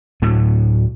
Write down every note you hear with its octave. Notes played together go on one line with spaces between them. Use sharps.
D2 A2 F#3 A3